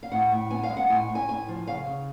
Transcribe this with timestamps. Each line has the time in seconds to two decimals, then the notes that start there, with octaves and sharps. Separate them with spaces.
0.03 F5
0.12 A2 F#5
0.32 A2
0.50 B3 G#5
0.63 F5
0.70 G#3
0.77 F#5
0.89 A2 G#5
1.09 A2
1.15 G#5
1.28 A2 G#5
1.49 F3
1.67 C#3 F5
1.87 C#3